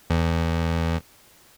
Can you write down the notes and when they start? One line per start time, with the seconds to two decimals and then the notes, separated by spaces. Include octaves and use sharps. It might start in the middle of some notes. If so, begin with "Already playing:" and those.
0.10 E2